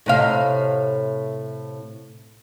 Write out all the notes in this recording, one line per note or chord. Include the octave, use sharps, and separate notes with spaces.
A2 C3 F5